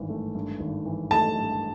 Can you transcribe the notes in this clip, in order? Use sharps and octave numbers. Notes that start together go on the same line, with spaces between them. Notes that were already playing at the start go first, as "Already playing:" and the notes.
Already playing: G#1 G2 E3
A3
G2
G#1
E3
A3 A5
G2